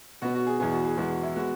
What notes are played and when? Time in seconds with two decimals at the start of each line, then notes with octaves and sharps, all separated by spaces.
0.22 B2 B3 F#4
0.34 F#4
0.47 G#4
0.60 E2 B2 B3 G#4
0.72 F#4
0.85 G#4
0.98 E2 B2 G#3 B3 F#4
1.11 F#4
1.23 E4
1.36 G#3 B3 F#4